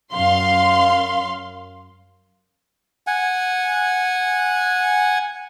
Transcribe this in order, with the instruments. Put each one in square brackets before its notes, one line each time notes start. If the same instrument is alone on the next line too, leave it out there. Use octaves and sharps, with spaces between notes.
[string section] F#2 F5 C6
[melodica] F#5 G#5